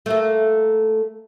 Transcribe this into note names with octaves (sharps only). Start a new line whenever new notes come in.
A3 A#3